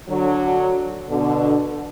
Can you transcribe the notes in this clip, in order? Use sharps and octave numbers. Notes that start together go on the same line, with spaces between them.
D3 F#3
B2 D3